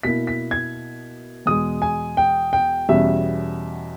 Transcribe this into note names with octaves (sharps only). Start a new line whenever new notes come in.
B2 A#3 E4 B6
B6
G#6
E2 B2 G#3 D#6
G#5
G5
G5
E2 B2 G3 C#4 E5